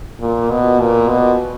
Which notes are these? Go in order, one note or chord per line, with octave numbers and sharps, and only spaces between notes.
A#2
B2
A#2
B2